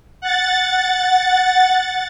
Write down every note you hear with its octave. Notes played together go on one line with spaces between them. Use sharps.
F#5 A6